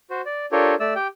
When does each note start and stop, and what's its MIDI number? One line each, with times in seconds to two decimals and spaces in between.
0.10 0.21 66
0.10 0.21 72
0.26 0.46 74
0.52 0.75 62
0.52 0.75 65
0.52 0.75 67
0.52 0.75 69
0.52 0.75 70
0.52 0.75 73
0.80 0.94 57
0.80 0.94 74
0.80 0.94 88
0.95 1.07 67
0.95 1.07 79